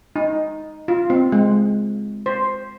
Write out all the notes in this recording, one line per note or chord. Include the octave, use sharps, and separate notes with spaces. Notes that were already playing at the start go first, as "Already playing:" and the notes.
D#4
F4
C4
G#3
C5